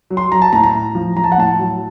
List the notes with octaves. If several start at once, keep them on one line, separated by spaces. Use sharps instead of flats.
F#3
C6
F#3 A#5
A5
A2 A#5
A#5
A2
F3
F3 A#5
A5
F#5
A2 A5
F#3